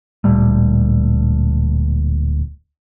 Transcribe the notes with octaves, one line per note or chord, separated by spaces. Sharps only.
D1 A#2 G3 A3